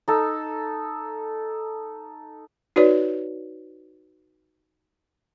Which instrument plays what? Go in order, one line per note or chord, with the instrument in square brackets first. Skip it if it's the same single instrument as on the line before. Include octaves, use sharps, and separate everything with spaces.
[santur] D#4 A4
[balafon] D#4 F#4 B4 C#5 D5